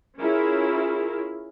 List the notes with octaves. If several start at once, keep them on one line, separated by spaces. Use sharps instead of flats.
C#4 E4 F4 G#4 A#4